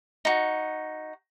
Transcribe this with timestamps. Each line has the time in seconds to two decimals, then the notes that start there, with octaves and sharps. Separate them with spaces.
0.25 D#4 F#4